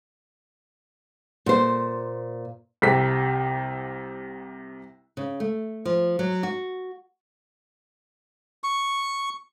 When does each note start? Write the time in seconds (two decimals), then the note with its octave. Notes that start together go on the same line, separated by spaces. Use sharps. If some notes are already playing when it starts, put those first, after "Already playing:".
1.46 A#2 C5
2.82 C2 C3 B6
5.17 C#3
5.40 A3
5.85 F3
6.19 F#3
6.43 F#4
8.64 C#6